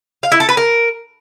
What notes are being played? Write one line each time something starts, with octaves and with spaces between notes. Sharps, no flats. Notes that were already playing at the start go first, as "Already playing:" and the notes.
F5
E4
A4
B4
A#4